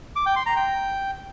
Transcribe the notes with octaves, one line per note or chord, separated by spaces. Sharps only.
D6
G5
C6
A#5
G5